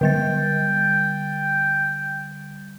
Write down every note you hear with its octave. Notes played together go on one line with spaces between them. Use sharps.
D3 G3 G5 A6